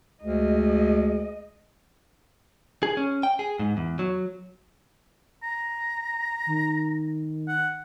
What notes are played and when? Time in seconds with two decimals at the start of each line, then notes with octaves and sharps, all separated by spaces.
0.23 D2 G#3 D#5
2.83 G#4
2.97 C#4
3.23 G5
3.39 G#4
3.59 G#2
3.77 E2
3.99 F#3
5.43 A#5
6.47 D#3
7.48 F#5